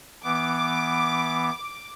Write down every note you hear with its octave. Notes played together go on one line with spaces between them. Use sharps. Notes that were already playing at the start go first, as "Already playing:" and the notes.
E3 B3 D6